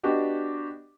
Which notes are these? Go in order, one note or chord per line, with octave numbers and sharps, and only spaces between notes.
B3 D4 F#4 G4 D#5